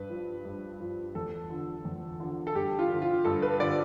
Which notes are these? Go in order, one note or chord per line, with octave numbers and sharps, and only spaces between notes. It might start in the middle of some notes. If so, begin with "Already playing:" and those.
Already playing: G2 B4
F3
G2
F3
E2 A4
D3 F3
E2
D3 F3
A4
G2 G4
F4
D3 F3
F4
G2 A4
B4
D3 F3 D5